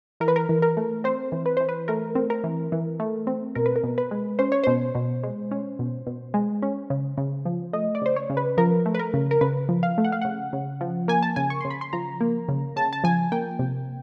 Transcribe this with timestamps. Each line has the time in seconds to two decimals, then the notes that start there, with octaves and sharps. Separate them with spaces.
0.20 E3 A#4
0.28 B4
0.36 A#4
0.49 E3
0.62 A#4
0.77 A3
1.04 C4 C5
1.32 E3
1.46 B4
1.57 E3 C5
1.69 B4
1.88 A3 A#4
2.15 C4
2.30 A#4
2.44 E3
2.72 E3
3.00 A3
3.27 C4
3.55 B2 A#4
3.66 B4
3.76 A#4
3.83 B2
3.98 B4
4.11 G#3
4.39 C#4 C5
4.52 C#5
4.63 B2 C5
4.95 B2
5.23 G#3
5.51 C#4
5.79 B2
6.07 B2
6.34 G#3
6.62 C#4
6.90 C#3
7.18 C#3
7.45 F3
7.73 A3 D#5
7.95 D5
8.02 C#3 C5
8.16 C#5
8.30 C#3
8.37 B4
8.57 F3 A#4
8.86 A3
8.94 B4
8.99 A#4
9.14 C#3
9.31 A#4
9.41 C#3 B4
9.69 F3
9.83 F5
9.98 A3
10.05 F#5
10.12 F5
10.22 C#3 F#5
10.53 C#3
10.81 F3
11.08 A#3 G#5
11.23 A5
11.36 C#3 G#5
11.50 C#6
11.61 C#3 C6
11.70 B5
11.81 C6
11.93 F3 A#5
12.21 A#3
12.48 C#3
12.76 C#3 A5
12.93 A5
13.04 F3 G#5
13.32 A#3 G5
13.59 C3